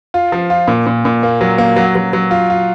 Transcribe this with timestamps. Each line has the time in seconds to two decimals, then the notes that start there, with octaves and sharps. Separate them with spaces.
0.14 F4
0.32 F3
0.50 F4
0.68 A#2
0.86 A#2
1.05 A#2
1.23 A#3
1.41 F#3
1.58 A#3
1.76 F#3
1.95 F#3
2.13 F#3
2.31 F4
2.50 F4